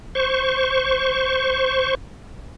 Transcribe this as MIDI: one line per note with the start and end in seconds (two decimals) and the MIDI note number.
0.15 1.95 72
0.15 1.95 85